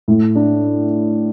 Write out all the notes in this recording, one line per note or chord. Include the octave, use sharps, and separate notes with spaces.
A2
D4